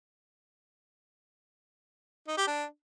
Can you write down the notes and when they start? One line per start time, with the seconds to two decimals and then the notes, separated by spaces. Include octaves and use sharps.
2.28 D#4
2.37 G4
2.47 D4